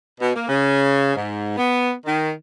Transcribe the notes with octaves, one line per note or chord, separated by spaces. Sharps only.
B2
A#3
C#3
G#2
B3
D#3